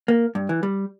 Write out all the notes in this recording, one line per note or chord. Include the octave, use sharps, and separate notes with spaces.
A#3
G2
E3
G3